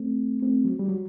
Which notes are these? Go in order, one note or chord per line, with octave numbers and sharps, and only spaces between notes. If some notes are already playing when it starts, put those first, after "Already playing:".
Already playing: A3 C4
A3 C4
F#3
G3
F#3